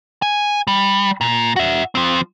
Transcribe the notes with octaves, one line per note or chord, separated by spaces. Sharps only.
G#5
G3
A#2
F#4 E5
F3 C4